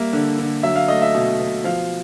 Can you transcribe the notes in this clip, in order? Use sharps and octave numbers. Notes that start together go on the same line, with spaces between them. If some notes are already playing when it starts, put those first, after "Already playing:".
Already playing: G3 A#3 E5
D3
D3
F#3 E5
F5
A3 D#5
E5
B2
B2
F3 F5